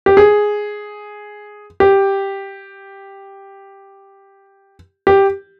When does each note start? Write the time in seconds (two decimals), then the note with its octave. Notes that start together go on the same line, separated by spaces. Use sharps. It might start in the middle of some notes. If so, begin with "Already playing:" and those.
0.06 G4
0.17 G#4
1.80 G4
5.07 G4